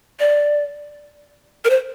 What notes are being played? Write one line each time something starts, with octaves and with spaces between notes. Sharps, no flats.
D5
A#4
C5